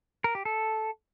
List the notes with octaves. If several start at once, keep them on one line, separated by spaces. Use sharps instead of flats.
A#4
G4
A4